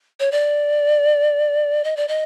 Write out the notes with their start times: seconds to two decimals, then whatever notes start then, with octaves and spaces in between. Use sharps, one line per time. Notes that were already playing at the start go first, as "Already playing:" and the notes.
0.20 C#5
0.32 D5
1.84 D#5
1.97 D5
2.08 D#5